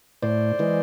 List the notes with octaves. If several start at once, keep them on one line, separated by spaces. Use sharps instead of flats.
A2 C5 D5
E3 G#3